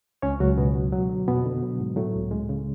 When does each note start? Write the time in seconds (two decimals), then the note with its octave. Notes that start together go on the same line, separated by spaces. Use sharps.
0.22 C#2 C#4 C#5
0.40 C#2 F#3 F#4
0.58 G#2 B2 B3
0.75 F#3
0.93 F#3
1.09 D3
1.27 F2 B2 B3
1.45 D3
1.63 F#3
1.80 G#2
1.96 A2 F#3 A3
2.14 C#2
2.31 C#3 G#3
2.49 C#3